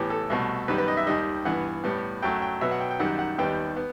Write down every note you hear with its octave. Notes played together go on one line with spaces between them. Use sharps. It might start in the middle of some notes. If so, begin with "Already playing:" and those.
Already playing: A2 E3 B3 G4
A4
C2 B2 A3
F#2 D#3 G3 B3 B4
B4
D#5
E5
D#2 D#3 G3 D#5
G2 E3 B3 F#5
A2 G3 B3
F#2 F#3 A3 G5
G5
B2 F#3 B3 E5
F#5
G5
G5
F#2 D#3 G3 F#5
F#5
D#2 D#3 G3 B3 G5
B3